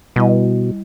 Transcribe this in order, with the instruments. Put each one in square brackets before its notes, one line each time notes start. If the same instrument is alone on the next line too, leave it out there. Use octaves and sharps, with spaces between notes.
[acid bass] B2 [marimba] G3 E4 D#5